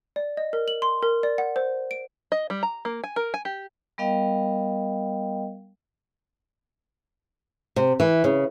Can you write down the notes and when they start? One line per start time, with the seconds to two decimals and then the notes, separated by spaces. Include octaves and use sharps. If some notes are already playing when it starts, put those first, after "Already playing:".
0.16 D5
0.37 D#5
0.53 A#4
0.68 F#7
0.82 C6
1.02 A#4
1.23 D5
1.38 F#5
1.56 C5
1.91 D7
2.32 D#5
2.50 G3
2.63 A#5
2.85 A#3
3.04 G#5
3.16 A#4
3.34 G#5
3.45 G4
3.98 G3 B3 A#4 D#5 F5 G5
7.76 C3
8.00 E3
8.24 C#3